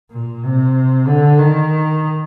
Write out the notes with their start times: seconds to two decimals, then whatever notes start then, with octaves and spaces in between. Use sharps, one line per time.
0.11 A#2
0.43 C3
1.07 D3
1.39 D#3